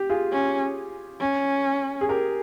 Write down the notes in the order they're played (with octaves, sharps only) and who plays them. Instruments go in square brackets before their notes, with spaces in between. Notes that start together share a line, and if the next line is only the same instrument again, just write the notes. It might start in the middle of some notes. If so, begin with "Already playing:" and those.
Already playing: [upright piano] G4
F4 G#4
[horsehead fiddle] C#4
C#4
[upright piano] G#4
G4 A#4